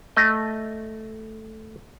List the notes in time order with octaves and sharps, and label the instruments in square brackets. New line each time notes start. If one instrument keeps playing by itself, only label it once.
[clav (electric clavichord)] A3 D#5